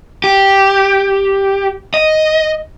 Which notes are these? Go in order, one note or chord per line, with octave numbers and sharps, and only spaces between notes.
G4
D#5